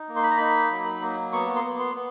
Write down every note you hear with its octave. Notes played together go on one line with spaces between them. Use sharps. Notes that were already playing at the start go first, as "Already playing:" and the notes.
Already playing: D#4
A#3
C6
B5
A#5
D#4 B5
F#3
A#3
B3 C#6
C6
B3
C6
B3